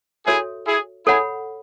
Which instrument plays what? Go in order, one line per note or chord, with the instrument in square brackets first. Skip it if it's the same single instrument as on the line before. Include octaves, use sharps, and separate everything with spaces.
[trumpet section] E4 G#4 [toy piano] F#4 A4 C#5 E5
[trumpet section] E4 G#4
[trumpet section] E4 G#4 [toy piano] A4 C#5 F#5 B5